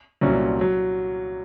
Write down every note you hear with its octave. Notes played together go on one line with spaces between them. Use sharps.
C2 A#2 F#3 C#4 F#4
F#3